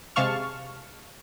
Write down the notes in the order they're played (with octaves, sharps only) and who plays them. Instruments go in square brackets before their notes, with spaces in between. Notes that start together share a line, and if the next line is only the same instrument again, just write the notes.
[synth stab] C3 G#3 F5 A5 C#6 F6